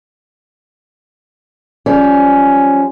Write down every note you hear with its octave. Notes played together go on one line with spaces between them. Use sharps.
F3 G3 C#4